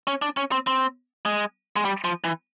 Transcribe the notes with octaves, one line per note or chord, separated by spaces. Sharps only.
C#4
D4
C#4
C4
C4
G#3
G#3
G3
F3
E3